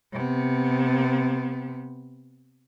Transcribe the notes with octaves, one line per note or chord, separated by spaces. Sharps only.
C3 B3